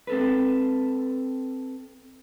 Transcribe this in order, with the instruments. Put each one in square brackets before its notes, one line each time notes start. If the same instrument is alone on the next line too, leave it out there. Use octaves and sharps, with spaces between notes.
[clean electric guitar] C4 A4 B4